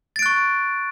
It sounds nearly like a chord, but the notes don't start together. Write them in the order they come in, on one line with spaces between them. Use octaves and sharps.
A6 D7 F#6 C#6